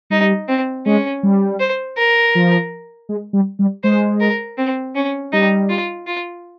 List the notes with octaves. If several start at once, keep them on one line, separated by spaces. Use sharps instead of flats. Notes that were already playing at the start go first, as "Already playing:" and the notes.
G3 D#4
C4
G#3 C#4
G3
C5
A#4
F3
G#3
G3
G3
G#3 C5
A#4
C4
C#4
G3 D#4
F4
F4